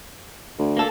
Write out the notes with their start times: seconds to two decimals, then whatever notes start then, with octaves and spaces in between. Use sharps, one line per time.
0.59 D2
0.77 A#3 A4